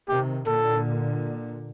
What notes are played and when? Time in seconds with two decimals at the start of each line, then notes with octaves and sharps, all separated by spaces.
0.09 C3 D#3 G4
0.46 A#2 D3 A4